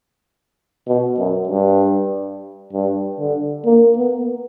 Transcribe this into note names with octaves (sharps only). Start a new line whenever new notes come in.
B2
F#2
G2
G2
D3
A#3
B3